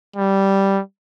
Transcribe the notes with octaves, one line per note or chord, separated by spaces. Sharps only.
G3